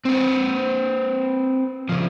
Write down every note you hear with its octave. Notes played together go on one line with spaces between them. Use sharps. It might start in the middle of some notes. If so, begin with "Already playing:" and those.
C4 B4
C#3 F3